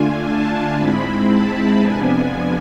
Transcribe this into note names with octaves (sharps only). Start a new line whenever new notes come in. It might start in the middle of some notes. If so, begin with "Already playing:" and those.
Already playing: D3 A3 D4 F4 G#5
A5
G#2 G#3 C4 E4 B5
A5
F2 C3 F3 B3 D4 G#5